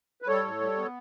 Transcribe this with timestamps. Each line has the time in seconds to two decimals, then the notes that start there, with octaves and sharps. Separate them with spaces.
0.22 B4
0.27 G3 A4 C#5
0.44 A2
0.61 G3
0.77 B3